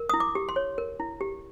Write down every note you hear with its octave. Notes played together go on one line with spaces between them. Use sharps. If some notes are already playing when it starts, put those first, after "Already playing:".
Already playing: A#4
E4 D#6
D6
G4
C6
C#5
A#4
E4
G4